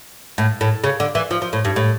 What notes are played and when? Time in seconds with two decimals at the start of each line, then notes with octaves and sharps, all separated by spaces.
0.38 A2
0.61 A2
0.84 C#3
1.00 D3
1.15 E3
1.31 F3
1.42 F3
1.53 A2
1.65 G2
1.76 A2